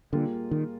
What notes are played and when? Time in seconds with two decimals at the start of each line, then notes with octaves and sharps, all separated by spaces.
0.12 A#2 D3 G3 A#3 F4 G#4
0.51 D#3